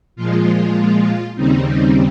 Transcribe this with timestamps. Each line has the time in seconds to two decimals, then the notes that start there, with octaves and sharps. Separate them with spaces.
0.16 A#2 F3 G#3 F4
1.35 D#2 C#3 G3 C4 D#4
1.66 D#4